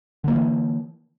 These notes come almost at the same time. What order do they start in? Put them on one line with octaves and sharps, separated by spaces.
D3 A#3 G3 E3